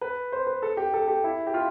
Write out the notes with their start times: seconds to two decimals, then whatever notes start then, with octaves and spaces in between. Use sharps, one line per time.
0.01 B4
0.32 C5
0.47 B4
0.62 A4
0.77 G4
0.93 A4
1.08 G4
1.24 E4
1.47 G4
1.54 F4